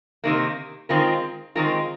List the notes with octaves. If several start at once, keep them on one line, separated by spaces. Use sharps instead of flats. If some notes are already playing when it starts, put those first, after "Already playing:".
C3 D#3 A#3
D#3 G#3 C4 F4 A#4
D#3 G#3 C4 F4 A#4